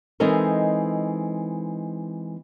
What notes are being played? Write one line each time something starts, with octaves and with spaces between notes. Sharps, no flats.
E3 G#3 C4 D#4 A4 A#4